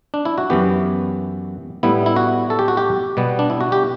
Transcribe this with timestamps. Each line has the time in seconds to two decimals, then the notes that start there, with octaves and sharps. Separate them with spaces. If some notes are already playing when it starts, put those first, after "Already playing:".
0.14 D4
0.25 E4
0.38 F#4
0.50 F#2 E3 B3 G4
1.83 A2 G3 B3 E4
2.06 E4
2.16 F#4
2.50 A4
2.59 G4
2.68 F#4
2.77 G4
3.17 B2 G3 B3
3.39 D4
3.50 E4
3.61 F#4
3.72 G4